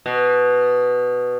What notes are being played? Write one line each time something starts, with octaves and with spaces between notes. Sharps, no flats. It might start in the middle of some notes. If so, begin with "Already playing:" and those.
B2